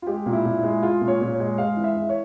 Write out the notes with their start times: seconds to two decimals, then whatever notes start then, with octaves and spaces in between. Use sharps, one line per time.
0.02 F4
0.07 G#3 G4
0.26 A#2
0.33 E4
0.45 A#2
0.58 E4
0.63 G#3
0.83 G#3 F4
1.01 A#2
1.08 C#5
1.21 A#2
1.33 C#5
1.40 G#3
1.58 G#3 F5
1.77 E3
1.84 E5
1.96 E3
2.09 C#5